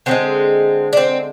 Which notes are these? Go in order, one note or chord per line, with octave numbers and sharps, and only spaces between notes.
D3 F3 G#3 C4
D4
C4